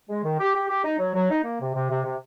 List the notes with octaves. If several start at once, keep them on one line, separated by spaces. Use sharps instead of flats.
G#3
D#3
G4
G4
G4
D#4
F#3
F#3
D#4
A#3
C3
C3
C3
C3